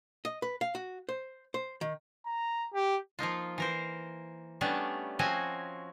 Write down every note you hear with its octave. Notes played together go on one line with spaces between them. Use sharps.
D#5
B4
F5
F#4
C5
C5
D#3
A#5
G4
F3 A#3 D#4 F4
E3 A#4 C5
G3 A3 B3 C#4 D4
F3 C4 C#4 F#4 D#5 G#5